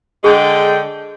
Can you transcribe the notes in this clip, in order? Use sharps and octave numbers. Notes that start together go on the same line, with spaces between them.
D3 G#3 G#4 G5